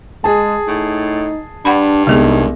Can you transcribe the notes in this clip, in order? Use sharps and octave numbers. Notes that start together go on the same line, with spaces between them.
G#3 G#4 A5
A2 D#4
G2 D4 F#5 B5
C2 G#3 B3 D#4 G#4